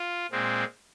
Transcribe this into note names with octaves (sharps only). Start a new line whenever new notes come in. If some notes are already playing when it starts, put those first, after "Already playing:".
Already playing: F4
A#2 G#3 C4